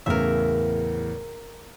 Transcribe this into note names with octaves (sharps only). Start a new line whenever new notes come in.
E2 A2 C#3 A#4 E5